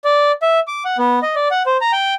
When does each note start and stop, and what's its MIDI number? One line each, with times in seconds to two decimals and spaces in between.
0.04 0.32 74
0.42 0.60 76
0.68 0.83 86
0.85 0.97 78
0.98 1.19 59
1.22 1.35 75
1.35 1.48 74
1.51 1.63 78
1.66 1.77 72
1.81 1.92 82
1.92 2.14 79